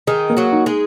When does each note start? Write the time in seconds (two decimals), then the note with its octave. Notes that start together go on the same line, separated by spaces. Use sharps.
0.07 D#3 D#4 G#4
0.30 A#3
0.37 F#3 F#4
0.52 D#4
0.66 G#3 G#4